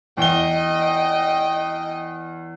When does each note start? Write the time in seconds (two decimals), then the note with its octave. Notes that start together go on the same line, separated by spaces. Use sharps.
0.17 E2 D#5 G5 G7